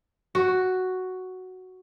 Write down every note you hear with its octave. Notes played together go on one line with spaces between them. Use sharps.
F#4